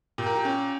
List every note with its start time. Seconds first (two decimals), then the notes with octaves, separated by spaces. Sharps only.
0.18 A#2 G4
0.26 A#4
0.36 G4
0.45 C#4